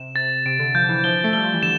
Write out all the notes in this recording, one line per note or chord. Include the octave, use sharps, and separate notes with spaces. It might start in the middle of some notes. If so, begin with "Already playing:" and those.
Already playing: C3 E7
C3 A6
C3 D7
D3
F3 G6
D3
E3
F3 G7
A3
G3 G7
F3
E3
D3 E7